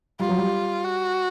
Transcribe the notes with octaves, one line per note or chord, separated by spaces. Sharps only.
G3 F4
F#3
G3
F#4